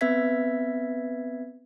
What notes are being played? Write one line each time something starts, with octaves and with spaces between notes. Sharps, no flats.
B3 C4 B4 E5 G#6 B6